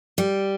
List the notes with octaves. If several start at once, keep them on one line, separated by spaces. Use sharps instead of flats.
G3